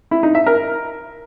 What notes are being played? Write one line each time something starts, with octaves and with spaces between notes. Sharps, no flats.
E4
D#4
E5
A#4